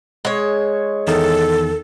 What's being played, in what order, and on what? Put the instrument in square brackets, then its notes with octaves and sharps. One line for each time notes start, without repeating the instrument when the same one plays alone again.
[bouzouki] G#3 C#5
[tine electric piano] E2 D#3 [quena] A4